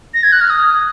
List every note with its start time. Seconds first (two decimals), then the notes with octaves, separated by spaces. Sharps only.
0.14 A#6
0.23 G#6
0.32 F#6
0.41 F6
0.50 D#6